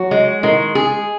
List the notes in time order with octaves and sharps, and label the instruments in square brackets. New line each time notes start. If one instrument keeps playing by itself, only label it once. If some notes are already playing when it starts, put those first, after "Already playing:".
Already playing: [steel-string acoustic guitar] F#3 [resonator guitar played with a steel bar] F#4
[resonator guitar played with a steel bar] G#3
[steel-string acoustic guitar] D#3 [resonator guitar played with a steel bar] G#3
[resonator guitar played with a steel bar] G#4